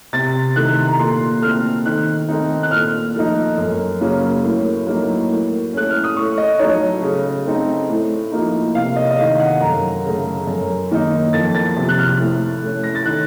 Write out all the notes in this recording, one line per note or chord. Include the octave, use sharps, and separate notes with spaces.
C3 A6
D#3 A3 F#6
A#5
A#2 C6
A3 C4 F6
D#3 F#6
A3 C4 D#4
F#6
A#2 F6
F3 A3 D#4
F#2
C#3 F#3 A#3 C#4
A2
F#3 A#3 D#4
A2
A3 C#4 F#6
F6
D#6
A2 C#6
D#5
F#3 A3 D#4 C#5
C#3
A3 C4 D#4
A2
F3 A#3 D#4
C3 F5
D#5
D#5
D#3 A3 F5
F#5
F#2 A#5
C#3 A3
F#2
D#3 A#3 D#4
F2 A6
A6
C3 F3
F#6
F6
A2
A3 C#4
A#6
A6
D#3 F#6